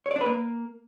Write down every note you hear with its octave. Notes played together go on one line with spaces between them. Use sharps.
C#5
D5
D4
B4
A#3